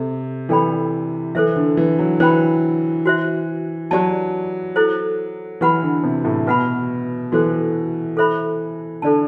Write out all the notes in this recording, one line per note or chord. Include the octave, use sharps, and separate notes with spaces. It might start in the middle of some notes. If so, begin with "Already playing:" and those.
Already playing: C3 A4
E3 D4 A4 D5 G5 B5
E3 A4 C5 E5
D3
E3
F#3
E3 C5 G5 B5
F#4 C5 E5
F#3 G4 D5 A5
E4 A4 C5
E3 G4 B4 F#5 B5
D3
C3
A2
B2 F#4 B4 F#5 B5
E3 F#4 A4 C5
A4 C5 E5 B5
D3 A4 D5 A5